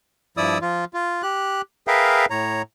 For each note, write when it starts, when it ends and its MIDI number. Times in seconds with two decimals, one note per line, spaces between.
0.37 0.58 43
0.37 0.58 53
0.37 0.58 64
0.37 0.58 74
0.37 0.58 87
0.37 0.58 88
0.62 0.85 53
0.62 0.85 65
0.94 1.22 65
1.23 1.62 67
1.23 1.62 90
1.87 2.26 68
1.87 2.26 70
1.87 2.26 71
1.87 2.26 76
1.87 2.26 77
1.87 2.26 79
2.30 2.62 45
2.30 2.62 73
2.30 2.62 82